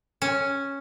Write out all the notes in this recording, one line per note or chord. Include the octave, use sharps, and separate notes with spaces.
C#4